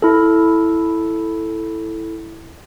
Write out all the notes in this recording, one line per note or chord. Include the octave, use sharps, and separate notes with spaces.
E4 A4